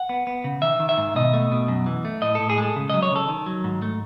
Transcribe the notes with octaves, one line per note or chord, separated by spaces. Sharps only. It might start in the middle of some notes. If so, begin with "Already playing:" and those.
Already playing: F#5
B3
B3
C#3
D#3 E5
D#3
E5
G#2
B2 D#5
A3
B2
F#2
E3
A3
A2 D#5
A2 A4
G#4
G#3 A4
C#3
F#3 D#5
C#5
C#3 A4
D#3
F#3
G#2
A3